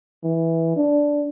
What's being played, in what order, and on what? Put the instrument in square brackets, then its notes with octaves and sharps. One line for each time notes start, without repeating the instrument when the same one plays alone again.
[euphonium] E3
D4